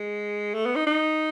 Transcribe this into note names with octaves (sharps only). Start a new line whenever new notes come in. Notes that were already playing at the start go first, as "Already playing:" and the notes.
Already playing: G#3
A3
B3
D#4
D#4